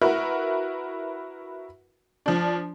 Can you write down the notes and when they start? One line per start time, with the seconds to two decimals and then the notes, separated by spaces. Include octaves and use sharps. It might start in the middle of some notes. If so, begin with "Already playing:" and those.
0.01 E4 F#4 A#4 B4
2.26 F3 D4